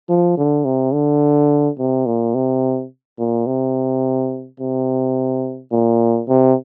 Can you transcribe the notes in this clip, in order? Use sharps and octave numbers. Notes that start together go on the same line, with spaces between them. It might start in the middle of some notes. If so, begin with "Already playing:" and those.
F3
D3
C3
D3
C3
A#2
C3
A#2
C3
C3
A#2
C3